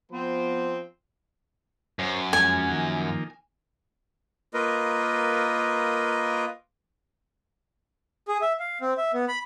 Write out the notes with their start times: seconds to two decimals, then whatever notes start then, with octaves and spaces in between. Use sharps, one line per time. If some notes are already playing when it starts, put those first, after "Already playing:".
0.11 F3 B3 C4 C5
1.99 F#2 C5 C#5
2.33 F2 G#3 C#4 G#5
2.70 D#3 F3 A#3
4.54 A#3 F4 A#4 B4 D#5
8.28 G#4
8.42 E5
8.60 F5
8.81 C4
8.98 E5
9.13 B3
9.28 B5